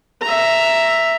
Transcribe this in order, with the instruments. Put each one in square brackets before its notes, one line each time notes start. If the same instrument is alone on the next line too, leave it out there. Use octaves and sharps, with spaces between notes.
[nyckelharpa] E5 A#5